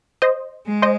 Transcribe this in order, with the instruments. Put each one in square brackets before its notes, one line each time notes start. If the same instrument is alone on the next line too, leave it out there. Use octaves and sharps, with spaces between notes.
[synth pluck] C5 D#5
[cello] G#3
[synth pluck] C5 D#5